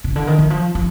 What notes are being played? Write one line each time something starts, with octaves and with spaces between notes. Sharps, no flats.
C#3
D3
D#3
E3
F3
F3